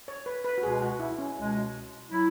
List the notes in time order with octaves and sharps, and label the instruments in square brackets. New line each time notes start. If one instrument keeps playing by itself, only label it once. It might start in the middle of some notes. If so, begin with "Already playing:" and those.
[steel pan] C#5
B4
B4
F#4
[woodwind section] C#2 B2 G#3 [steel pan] G#4
[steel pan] F#4
E4
C#4
[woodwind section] C#2 B2 G#3
F#3 E4